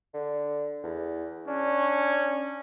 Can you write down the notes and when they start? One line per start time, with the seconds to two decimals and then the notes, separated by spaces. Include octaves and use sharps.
0.14 D3
0.84 E2
1.48 C#4 D4